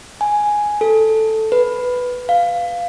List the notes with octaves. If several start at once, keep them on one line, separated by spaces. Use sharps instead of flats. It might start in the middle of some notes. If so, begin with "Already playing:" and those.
G#5
A4
B4
F5